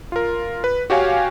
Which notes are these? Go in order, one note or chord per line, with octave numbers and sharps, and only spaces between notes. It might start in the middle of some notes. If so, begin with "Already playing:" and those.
F4 A#4
B4
F#4 G4 C#5 F5 G#5